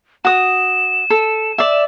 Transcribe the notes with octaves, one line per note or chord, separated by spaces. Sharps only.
F#4 D#6 E7
A4
D5 E5